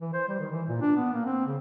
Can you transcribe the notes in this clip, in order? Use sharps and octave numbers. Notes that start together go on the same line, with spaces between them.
E3
C5
G3
D#3
E3
A#2
D4
B3
A#3
C4
C#3